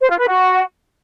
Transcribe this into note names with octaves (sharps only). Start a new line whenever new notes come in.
C5
F4
B4
F#4